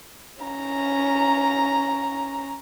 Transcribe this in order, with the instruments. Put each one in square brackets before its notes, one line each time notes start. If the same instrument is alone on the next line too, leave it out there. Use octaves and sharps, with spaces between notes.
[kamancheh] C#4 A#5